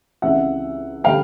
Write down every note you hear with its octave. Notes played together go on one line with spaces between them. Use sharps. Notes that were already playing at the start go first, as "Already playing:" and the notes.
C#2 C3 E3 E5 F#5
D3 G3 F5 G5